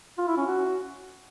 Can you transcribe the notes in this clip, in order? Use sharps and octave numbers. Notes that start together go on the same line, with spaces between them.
F4
E4
C#4
F#4